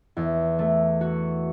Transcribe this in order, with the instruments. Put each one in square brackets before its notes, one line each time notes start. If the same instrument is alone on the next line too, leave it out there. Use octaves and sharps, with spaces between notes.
[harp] E2
A3
F#4